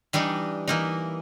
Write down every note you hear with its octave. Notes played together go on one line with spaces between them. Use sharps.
E3 G3 D4 D#4
E3 A#3 D#4